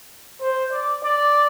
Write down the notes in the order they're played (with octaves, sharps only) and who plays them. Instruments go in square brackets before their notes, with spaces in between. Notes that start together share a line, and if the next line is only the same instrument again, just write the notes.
[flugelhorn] C5
D5
D5